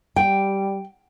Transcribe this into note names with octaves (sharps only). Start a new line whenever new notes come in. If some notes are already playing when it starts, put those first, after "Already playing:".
G3 G5